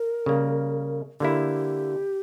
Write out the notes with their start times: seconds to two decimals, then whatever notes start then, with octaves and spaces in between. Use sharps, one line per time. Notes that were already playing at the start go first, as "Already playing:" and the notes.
Already playing: A#4
0.26 C#3 G3 A#3
1.20 D3 A#3 E4 G4